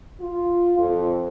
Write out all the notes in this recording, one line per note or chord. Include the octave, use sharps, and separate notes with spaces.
F4
F2